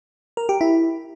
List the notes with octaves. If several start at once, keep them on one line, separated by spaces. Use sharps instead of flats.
A#4
G4
E4